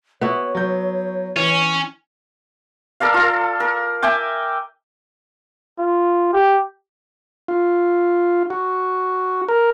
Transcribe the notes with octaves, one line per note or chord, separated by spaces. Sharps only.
B3 E4 F#4 C#5
F#3 G6
E3 C#4
A4 A#4 D5 F5
F4 A4
A#4
E5 G5 G#5 D6
F4
G4
F4
F#4
A#4